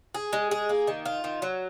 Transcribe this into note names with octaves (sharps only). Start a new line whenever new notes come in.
G#4
G#3
G#4
A#3
D#3
F4
D#3
F#3